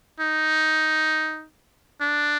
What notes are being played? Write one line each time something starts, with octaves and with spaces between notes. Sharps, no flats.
D#4
D4